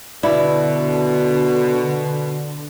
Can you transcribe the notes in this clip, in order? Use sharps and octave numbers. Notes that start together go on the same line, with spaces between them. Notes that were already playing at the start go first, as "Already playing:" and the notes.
B2 D3 E4 D5